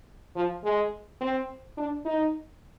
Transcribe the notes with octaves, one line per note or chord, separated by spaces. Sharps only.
F3
G#3
C4
D4
D#4